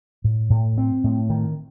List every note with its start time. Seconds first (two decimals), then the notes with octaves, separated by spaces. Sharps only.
0.24 A2
0.50 A2
0.78 C4
1.04 A2
1.30 D#3